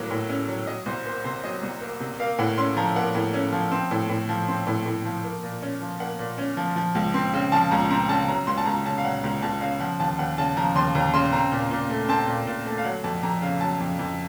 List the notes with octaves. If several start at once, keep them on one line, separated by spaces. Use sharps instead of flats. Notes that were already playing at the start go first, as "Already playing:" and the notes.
Already playing: A2 F#3 A#3
A2
C#4
F#3
F#3 D#5
C2 C5
A#3 C5
C3 C5
F#3 D#5
C2
A#3
C3
A#3 F5
A2 F#5
C#4 C6
F3 A#5
A#3 F#5
A2
C#4
F3
C4
A2
A2
F3
C4
A2
A2
F3
A#3
A#2
C#4
F3
A#3 F#5
A#2
C#4
F3
F3
C#2
C4
C#3
F3 A5
C#2 A#5
C4 A#5
C#3 A5
F#3 A#5
C#2 C6
A5
C#2 A#5
C#3 A5
F5
F#3 F#5
C#2 A#5
C#2 A5
C#3 F5
F3 F#5
D#2 A5
D#2 F#5
C#3 A5
F3 A#5
D#2 C6
D#2 A#5
C#3 C6
C4 A#5
A#2
A#2
A3
C4 A5
A#2
A#2
A3
F5
F#3 F#5
F2 A5
F2 A#5
C#3 F5
F#3 A5
F2
F2